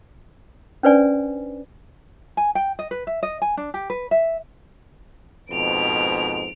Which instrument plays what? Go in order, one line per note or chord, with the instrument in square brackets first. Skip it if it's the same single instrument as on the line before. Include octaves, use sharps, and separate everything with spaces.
[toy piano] C#4 D4 B4 C5 D5 G#5
[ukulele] G#5
G5
D#5
B4
E5
D#5
G#5
D4
G4
B4
E5
[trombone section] F2 G#2 B2 [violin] D7 F7